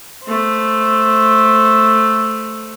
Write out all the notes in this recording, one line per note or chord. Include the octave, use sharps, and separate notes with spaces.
A3 C5